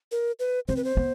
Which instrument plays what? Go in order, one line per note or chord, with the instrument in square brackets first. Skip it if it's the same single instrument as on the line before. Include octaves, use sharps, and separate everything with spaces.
[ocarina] A#4
B4
[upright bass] C4 [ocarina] C5
[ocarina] B4
C5
[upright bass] B3